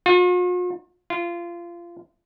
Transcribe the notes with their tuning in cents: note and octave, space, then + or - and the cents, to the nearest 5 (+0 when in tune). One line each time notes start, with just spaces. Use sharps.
F4 +45
F4 -25